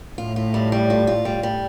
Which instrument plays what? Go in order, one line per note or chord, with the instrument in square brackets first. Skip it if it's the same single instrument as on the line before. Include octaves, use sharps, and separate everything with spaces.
[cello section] A2 [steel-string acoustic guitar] F4
[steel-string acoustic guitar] F4
G3
G3
F4
F4
G3
G3